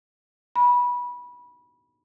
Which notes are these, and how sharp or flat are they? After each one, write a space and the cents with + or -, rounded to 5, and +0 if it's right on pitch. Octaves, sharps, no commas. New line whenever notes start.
B5 -20